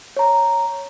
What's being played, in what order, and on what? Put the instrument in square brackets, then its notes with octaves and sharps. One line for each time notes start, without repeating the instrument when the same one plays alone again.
[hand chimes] C#5 A#5